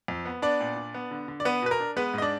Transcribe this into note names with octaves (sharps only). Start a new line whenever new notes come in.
F2
B3
B3 D4 D5
A#2
D4
B3
D3
D3
D5
B3 B4
B2 B4
A#4
D4
G#3 B3 B4
G#2 D#5
D4 D5